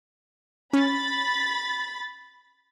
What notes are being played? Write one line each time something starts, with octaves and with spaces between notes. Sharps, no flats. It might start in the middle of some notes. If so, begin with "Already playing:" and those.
C#4 B5 A6